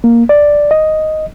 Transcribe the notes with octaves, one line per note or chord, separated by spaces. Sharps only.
A#3
D5
D#5